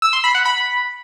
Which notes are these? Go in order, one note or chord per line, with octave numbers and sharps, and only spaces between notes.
E6
C6
B5
F#5
B5